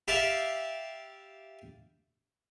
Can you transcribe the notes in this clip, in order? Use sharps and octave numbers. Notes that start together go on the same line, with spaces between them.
G4 E5 F5 A5 B5 D6